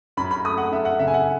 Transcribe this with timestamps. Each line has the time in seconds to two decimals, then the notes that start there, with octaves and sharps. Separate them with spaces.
0.17 F#2 B5
0.31 B5
0.45 A3 D#6
0.58 F#5
0.71 F#2 E5
0.85 F#5
0.99 C#3 E5
1.07 G#5
1.14 F#5